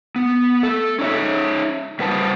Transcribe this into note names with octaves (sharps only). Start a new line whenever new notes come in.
B3
A3 A4
C#4 D#4 C#5 E5
C#3 G3 B4 C5 F#5 A5